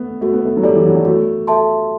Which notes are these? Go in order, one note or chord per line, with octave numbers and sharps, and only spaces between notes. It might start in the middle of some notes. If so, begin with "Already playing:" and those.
Already playing: A3 B3
A3 F#4
B3
A3
F#3
G3 A4 D5
E3
F#3
G3
A3 F#4
A4 E5 A5 C6